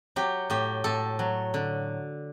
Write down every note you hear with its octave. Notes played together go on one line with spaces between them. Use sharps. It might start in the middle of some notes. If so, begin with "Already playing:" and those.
F#3 G4
A2 G4
A2 A4
F#3
D3